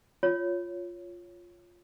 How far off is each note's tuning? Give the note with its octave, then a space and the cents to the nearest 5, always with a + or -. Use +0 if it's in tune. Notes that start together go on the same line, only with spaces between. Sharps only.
F4 +0 C#5 +0